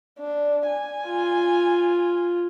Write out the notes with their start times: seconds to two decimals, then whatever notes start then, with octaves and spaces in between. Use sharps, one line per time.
0.19 D4
0.67 G#5
1.07 F4